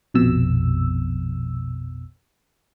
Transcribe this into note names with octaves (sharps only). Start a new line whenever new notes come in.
A#1 F2 B2 E6